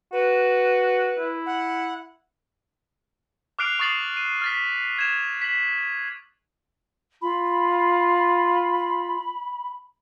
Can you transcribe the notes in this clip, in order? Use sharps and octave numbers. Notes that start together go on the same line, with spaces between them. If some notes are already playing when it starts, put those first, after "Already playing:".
F#4 B4
E4
F#5
D6 F6 F#6 C7 D7 F7
C#6 D#6 A6 C7 F#7
D#7
F6 A6 B6
G#6 E7
B6 F#7
F4 B5